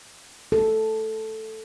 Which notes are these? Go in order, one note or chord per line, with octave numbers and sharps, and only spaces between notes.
A4